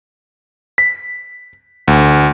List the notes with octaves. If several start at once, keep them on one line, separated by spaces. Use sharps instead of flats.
B6
D2